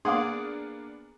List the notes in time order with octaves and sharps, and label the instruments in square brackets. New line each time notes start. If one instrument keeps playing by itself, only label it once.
[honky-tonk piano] A#3 B3 D4 [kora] G#4 D5 [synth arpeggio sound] F5 F#5 C6